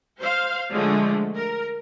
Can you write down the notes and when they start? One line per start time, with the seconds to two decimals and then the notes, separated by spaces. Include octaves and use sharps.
0.19 C5 F5
0.72 D3 F3 G#3 A3
1.35 A#4